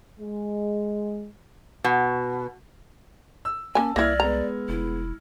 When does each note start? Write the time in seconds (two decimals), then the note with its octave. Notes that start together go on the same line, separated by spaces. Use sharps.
0.20 G#3
1.84 B2
3.45 E6
3.75 A#3 C#4 G#5 A5
3.96 C2 A#3 E4 D5 F6 G#6 A#6
4.20 G#3 B3 A#5
4.69 F1 E4